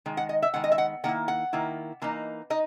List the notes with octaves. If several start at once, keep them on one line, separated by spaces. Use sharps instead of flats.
D#3 G#3
F#5
D#5
E5
D#3 G#3 B3 F#5
D#5
E5
F#5
D#3 A#3 E4 F#5
F#5
D#3 A#3 E4
E3 A#3 D#4
D#4 D#5